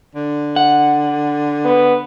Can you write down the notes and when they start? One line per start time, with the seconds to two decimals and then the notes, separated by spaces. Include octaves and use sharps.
0.15 D3
0.56 F#5
1.65 B3